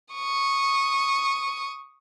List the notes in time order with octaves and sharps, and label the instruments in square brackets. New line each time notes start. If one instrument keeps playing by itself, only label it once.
[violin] C#6 D#6